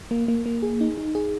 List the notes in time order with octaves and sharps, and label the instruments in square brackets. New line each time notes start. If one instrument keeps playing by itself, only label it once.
[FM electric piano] A#3
A#3
A#3
G#4
D#4
D#4
G#4